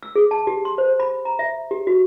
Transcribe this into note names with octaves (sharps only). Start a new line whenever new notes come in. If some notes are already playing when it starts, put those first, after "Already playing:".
E6
G#4
A5
G4
C6
C5
B5
A#5
E5
G4
F#4